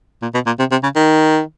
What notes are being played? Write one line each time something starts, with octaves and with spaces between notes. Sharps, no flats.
A#2
B2
A#2
C3
C3
C#3
D#3